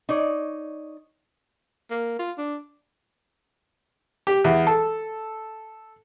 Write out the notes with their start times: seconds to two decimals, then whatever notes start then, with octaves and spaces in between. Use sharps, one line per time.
0.09 D#4 C#5 D5
1.90 A#3
2.19 F4
2.38 D4
4.27 G4
4.44 E2
4.67 A4